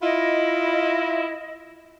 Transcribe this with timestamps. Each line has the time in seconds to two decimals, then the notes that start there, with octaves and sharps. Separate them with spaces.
0.03 E4 F4 D#5